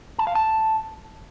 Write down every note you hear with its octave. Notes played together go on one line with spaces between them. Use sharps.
A5
F5
A5